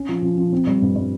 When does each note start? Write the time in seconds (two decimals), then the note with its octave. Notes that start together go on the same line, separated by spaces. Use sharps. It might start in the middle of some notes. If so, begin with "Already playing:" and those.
Already playing: C#4
0.09 F3
0.23 F3
0.37 F3
0.53 C4
0.67 G3
0.82 G2
0.96 G3